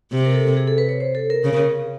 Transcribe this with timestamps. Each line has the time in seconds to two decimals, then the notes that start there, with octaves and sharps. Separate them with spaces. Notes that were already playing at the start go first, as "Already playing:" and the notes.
0.12 C3
0.26 A#4
0.34 A4
0.57 G#4
0.68 A4
0.78 B4
0.89 C#5
1.00 C5
1.15 A4
1.30 A#4
1.44 C#3